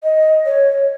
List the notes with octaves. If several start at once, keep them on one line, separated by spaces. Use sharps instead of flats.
D#5
C#5